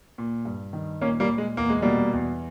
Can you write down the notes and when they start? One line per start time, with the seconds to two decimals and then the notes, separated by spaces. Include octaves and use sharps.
0.18 A#2
0.45 G2
0.73 D#3
1.01 A#2 A#3 C#4
1.20 G3 A#3
1.29 A#2
1.38 G#3
1.57 E2 A#3
1.70 G#3
1.82 B2 G3 A#3
2.13 E2